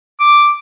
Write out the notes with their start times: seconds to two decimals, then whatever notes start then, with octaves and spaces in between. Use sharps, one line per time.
0.20 D6